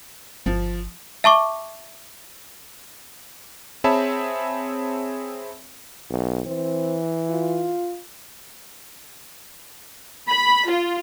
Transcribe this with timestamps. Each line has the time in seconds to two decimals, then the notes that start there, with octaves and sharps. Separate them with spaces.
0.46 G1 F3
1.24 E5 A5 C#6 D6
3.84 C4 G#4 C#5 E5 A5 B5
6.10 B1
6.46 E3 C4
7.29 F4
10.28 B5
10.67 F4